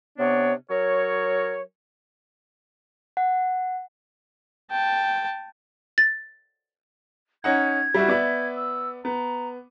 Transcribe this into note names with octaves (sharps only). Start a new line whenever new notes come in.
C3 B3 D4 C#5
F#3 A#4 C#5
F#5
G5 A5
A6
C#4 D#4 F#5 G#6
G3 E4 F#4
B3 D5 E5
E6
B3 A#5